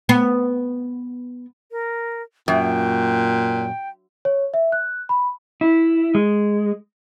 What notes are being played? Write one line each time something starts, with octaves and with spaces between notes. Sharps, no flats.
B3
A#4
F#2 A#2 G5
C#5
E5
F#6
B5
E4
G#3